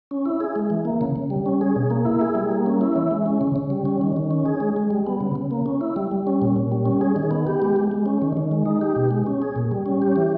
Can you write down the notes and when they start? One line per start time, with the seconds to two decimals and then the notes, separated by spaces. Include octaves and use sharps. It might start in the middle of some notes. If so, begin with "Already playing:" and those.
0.11 C#4
0.26 E4
0.41 G#4
0.56 G#3
0.70 E3
0.85 A#3
1.01 C#3
1.16 C#3
1.30 G3
1.46 C#4
1.61 G#4
1.76 B2
1.90 A#3
2.05 E4
2.21 G#4
2.35 G3
2.51 A#3
2.66 C#4
2.81 E4
2.96 E3
3.11 G#3
3.26 C#4
3.41 C#3
3.56 C#3
3.70 G3
3.85 C#4
4.01 D#3
4.16 D#3
4.31 C#4
4.46 G#4
4.60 G#3
4.76 G#3
4.91 G3
5.07 B3
5.21 C#3
5.35 C#3
5.51 A#3
5.66 C#4
5.81 E4
5.96 G3
6.11 G3
6.27 C#4
6.42 A#2
6.56 A#2
6.72 G3
6.86 C#4
7.01 G#4
7.16 D#3
7.31 B3
7.47 G4
7.62 G#3
7.76 G#3
7.91 G#3
8.06 C#4
8.22 D#3
8.37 D#3
8.51 G#3
8.66 D#4
8.81 G4
8.96 B2
9.11 G#3
9.26 C#4
9.42 G#4
9.56 A#2
9.71 G3
9.86 C#4
10.02 G4
10.16 E3